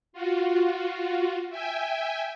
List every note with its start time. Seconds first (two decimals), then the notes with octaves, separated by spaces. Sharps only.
0.13 F4 F#4
1.50 E5 G5 G#5